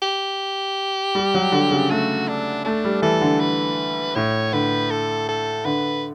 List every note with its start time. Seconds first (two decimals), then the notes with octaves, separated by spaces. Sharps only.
0.02 G4
1.15 G3
1.34 F#3
1.52 D3
1.71 C#3
1.90 A3 F#4
2.28 D4
2.65 A3 D4
2.85 G3
3.02 E3 A4
3.21 D3
3.40 B4
4.15 A2 C#5
4.53 D3 B4
4.91 A4
5.29 A4
5.65 D3 B4